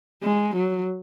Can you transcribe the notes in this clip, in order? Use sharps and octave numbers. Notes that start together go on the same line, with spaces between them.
G#3
F#3